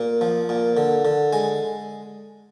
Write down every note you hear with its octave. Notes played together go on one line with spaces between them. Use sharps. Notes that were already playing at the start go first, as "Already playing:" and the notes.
Already playing: A#2
F3
A#2
D3
D3
G#3 G#5